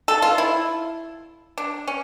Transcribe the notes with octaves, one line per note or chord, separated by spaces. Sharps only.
A4
F4
E4
D4
C#4